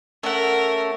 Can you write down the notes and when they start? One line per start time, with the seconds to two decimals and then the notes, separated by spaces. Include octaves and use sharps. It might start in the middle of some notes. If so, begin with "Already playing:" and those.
0.23 A3 C#4 A4 A#4 E5 F#5